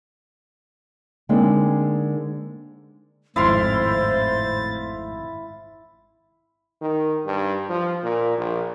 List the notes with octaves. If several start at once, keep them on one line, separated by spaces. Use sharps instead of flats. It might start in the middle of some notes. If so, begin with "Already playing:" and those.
D3 G#3 A#3 C4 D4 D#4
G#1 F2 A2 E4 C5 F5 C6 A6
D#3
G2
F3
A#2
A#1